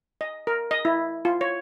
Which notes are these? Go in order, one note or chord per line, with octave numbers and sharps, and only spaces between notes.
D#5
A#4
D#5
E4
F4
C#5